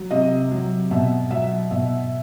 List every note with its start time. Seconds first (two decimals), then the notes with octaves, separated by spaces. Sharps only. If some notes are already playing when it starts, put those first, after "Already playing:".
Already playing: F#3
0.11 C3 D#5
0.51 F#3
0.91 B2 E5
1.31 F#3 E5
1.71 B2 E5